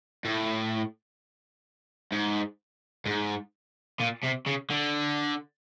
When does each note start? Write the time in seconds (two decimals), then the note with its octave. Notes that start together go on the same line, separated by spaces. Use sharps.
0.25 A2
2.12 G#2
3.06 G#2
4.00 A#2
4.23 C3
4.46 C#3
4.70 D3